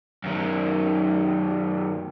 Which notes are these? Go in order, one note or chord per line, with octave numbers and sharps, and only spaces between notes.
F#2 D#3